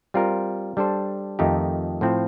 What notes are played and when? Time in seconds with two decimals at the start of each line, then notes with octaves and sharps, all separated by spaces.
0.14 G3 C4 F4 A#4
0.77 G3 D4 A4 C5
1.39 F2 D#3 A3 D#4 G4
2.01 A2 F3 C4